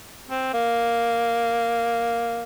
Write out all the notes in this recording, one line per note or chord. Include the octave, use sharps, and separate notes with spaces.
C4
A#3